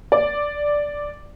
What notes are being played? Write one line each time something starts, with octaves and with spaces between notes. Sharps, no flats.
D5